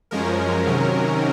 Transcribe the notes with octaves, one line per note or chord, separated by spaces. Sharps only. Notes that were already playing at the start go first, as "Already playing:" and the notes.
F#2 F3 G#3 C#4 A#4
C3 D#3 F#3 C#4